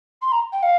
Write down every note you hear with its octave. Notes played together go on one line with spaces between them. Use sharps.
C6
A#5
G5
F5